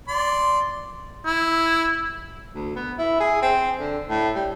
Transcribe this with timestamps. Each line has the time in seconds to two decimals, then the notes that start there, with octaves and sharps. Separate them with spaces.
0.08 D5 C6
1.26 E4
2.54 D2
2.76 B3
2.98 E4
3.20 G#4
3.42 C4
3.79 D3
4.09 A2
4.36 G3